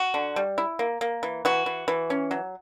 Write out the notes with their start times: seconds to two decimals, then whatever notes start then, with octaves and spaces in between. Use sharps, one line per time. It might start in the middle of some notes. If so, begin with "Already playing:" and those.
Already playing: F#4
0.14 D3
0.36 G3
0.58 E4
0.79 A#3
1.01 A#3
1.23 E3
1.45 E3 F#4
1.66 E3
1.88 E3
2.10 C#4
2.31 F#3